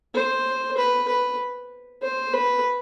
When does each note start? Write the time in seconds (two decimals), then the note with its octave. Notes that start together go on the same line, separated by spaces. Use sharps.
0.14 C5
0.77 B4
1.08 B4
2.02 C5
2.33 B4